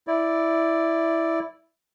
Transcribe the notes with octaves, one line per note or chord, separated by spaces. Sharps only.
E4 D5